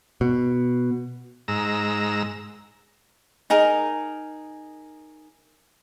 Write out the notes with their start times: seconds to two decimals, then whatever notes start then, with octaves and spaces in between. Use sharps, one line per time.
0.21 B2
1.48 G#2 A#5 E6
3.50 D#4 G#4 A#4